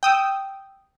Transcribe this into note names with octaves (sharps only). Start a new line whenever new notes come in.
G5 D#6 E6